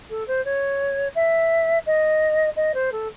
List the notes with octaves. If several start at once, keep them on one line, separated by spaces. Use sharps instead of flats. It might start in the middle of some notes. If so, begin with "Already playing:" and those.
A4
C5
C#5
E5
D#5
D#5
C5
A4